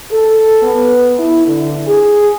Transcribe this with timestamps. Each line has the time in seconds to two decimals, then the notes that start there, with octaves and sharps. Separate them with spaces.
0.10 A4
0.62 B3
1.18 E4
1.46 D3
1.86 G#4